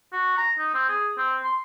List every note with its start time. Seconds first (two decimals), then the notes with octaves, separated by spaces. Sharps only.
0.13 F#4
0.37 A#5
0.58 D#4
0.74 C4
0.89 G#4
1.18 C4
1.44 C6